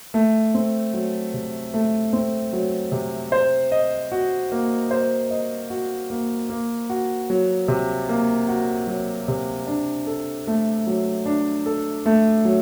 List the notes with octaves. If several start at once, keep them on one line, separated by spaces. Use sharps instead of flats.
A3
C4
F#3
C3
A3
C4
F#3
C3
C5
D#5
F#4
A#3
C5
D#5
F#4
A#3
A#3
F#4
F#3
C3
A#3
F#4
F#3
C3
D4
A4
A3
F#3
D4
A4
A3
F#3